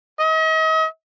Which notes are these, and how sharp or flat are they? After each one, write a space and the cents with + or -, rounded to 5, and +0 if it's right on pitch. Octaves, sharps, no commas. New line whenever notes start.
D#5 +40